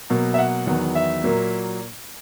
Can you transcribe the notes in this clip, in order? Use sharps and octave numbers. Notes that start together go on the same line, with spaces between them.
B2 F#3 A#3
E5
F#5
E2 D#3 F#3 B3
E5
A#2 F#3 A#3